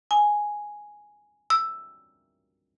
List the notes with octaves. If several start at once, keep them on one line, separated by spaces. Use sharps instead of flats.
G#5
E6